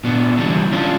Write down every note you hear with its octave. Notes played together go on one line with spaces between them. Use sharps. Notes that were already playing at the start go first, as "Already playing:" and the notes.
A#2 B3 D4
D3 E3 F#3 G3 D4
C#4 D4 F4